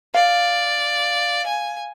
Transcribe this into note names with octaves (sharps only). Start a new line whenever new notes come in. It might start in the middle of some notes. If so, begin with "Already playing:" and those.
D5 F5
G#5